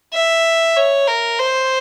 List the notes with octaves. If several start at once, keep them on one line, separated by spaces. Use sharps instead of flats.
E5
C#5
A#4
C5